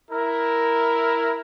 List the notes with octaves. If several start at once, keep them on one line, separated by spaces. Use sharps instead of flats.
E4 A#4